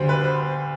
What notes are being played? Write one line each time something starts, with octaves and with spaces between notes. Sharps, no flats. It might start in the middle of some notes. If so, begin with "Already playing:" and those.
Already playing: D2 D3 G3 C5
B4
C5